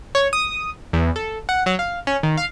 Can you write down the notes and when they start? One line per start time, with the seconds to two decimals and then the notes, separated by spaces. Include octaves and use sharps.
0.15 C#5
0.33 D#6
0.93 E2
1.16 A4
1.49 F#5
1.66 F#3
1.79 F5
2.07 C#4
2.23 D#3
2.37 F5